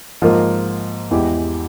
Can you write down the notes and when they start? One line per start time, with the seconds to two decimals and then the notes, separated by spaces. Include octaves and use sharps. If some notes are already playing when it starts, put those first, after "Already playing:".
0.22 G#2 F3 A#3
1.11 E2 E3 G#3 E4 G4